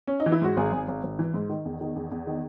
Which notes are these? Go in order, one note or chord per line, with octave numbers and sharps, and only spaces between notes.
C#4
D#4
E3
E4
G#2 F#4
G#1 G#4
G#1
G#1
G#1
E3
G#2
D#3
E2
D#3
E2
E2
D#3